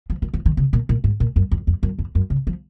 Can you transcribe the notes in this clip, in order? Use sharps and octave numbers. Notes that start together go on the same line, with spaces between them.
F3
D#3
F3
D#3
C#3
A#2
A#2
G#2
A#2
F#2
F2
F2
F#2
F2
F#2
C#3
F3